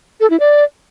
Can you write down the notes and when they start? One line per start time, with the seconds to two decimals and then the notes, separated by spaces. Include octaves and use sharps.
0.20 A4
0.30 E4
0.40 D5